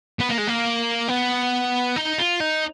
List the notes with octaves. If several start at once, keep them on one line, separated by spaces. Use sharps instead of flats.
B3
A#3
G#3
A#3
B3
D#4
F4
D#4